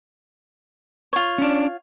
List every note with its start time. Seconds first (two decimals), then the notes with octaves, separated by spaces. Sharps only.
1.13 F4 C#5
1.38 C#4 D4